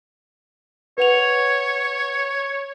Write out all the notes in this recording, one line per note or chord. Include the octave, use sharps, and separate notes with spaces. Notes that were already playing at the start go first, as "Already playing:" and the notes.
B4 C#5 F#5 F7